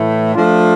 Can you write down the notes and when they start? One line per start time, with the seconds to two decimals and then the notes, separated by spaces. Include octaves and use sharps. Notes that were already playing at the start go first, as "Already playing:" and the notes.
Already playing: A2 E3 A3 E4
0.34 F3 A3 D4 F4